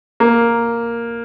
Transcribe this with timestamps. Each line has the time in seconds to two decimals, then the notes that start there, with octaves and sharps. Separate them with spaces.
0.20 A#3